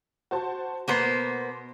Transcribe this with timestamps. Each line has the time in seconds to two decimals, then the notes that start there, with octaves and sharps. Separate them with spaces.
0.31 F#4 C5 A5
0.88 B2 A#3 B3 C5 C6 C7